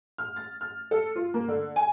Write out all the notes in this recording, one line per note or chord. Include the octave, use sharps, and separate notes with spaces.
F6
A6
F6
A4
F4
A#3
D3
G#5